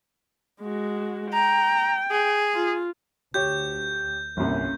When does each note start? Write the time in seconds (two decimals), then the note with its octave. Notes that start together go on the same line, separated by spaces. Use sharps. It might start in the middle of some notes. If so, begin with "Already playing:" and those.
0.61 G#3 F#4
1.33 G5 A#5
2.11 G#4
2.54 F4
3.34 D2 G4 C#5 G6
4.37 G1 C2 A#3 C#4